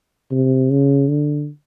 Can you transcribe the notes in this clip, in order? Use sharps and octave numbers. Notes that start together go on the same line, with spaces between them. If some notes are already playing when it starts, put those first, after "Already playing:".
C3
C#3
D3